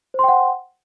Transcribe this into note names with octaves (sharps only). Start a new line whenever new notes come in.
C5 F#5 G5 C6